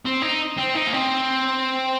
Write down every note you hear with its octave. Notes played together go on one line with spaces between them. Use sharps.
C4
D#4
C4
D#4
A#3
C4